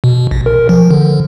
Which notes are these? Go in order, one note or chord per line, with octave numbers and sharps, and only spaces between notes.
B2
A#1
A#4
F3
D3